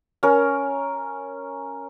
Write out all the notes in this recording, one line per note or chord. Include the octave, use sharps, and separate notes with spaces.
C#4 A#4